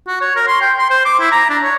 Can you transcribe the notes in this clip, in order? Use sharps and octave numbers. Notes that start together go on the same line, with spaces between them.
F#4
C#5
A#4
C6
G5
C6
C5
D6
E4
A#5
D4
C#5